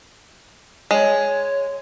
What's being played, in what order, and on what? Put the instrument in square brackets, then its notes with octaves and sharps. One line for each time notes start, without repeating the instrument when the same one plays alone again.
[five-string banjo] G#3 [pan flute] C#5